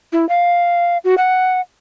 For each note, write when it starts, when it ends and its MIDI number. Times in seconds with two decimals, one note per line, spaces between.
0.12 0.28 64
0.29 0.98 77
1.04 1.15 66
1.18 1.61 78